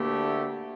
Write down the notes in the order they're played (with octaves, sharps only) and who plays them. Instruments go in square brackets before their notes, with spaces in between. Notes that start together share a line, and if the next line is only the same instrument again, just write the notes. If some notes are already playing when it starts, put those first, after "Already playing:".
Already playing: [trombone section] D2 D3 A3 E4 G4 [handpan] A#3